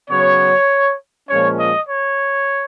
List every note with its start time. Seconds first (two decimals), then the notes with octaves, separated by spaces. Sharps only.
0.10 C#3 F#3 B3 C#5
1.30 A#2 F3 G#3 C#4 C#5
1.59 D#5
1.89 C#5